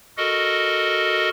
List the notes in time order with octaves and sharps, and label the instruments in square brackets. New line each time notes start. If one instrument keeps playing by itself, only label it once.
[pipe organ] F#4 A4 A#4 D#5